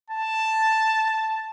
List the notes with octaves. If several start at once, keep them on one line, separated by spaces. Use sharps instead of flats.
A5